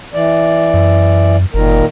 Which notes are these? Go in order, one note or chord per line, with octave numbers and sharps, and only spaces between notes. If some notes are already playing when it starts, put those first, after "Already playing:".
E3 D5
F#2
F#1 A#2 D#3 A#4